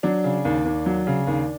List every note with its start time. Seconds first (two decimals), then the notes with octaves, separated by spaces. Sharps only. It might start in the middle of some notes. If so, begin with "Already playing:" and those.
0.03 F#3 D4
0.24 C#3
0.45 D#2
0.65 D#2
0.86 F#3
1.07 C#3
1.27 D#2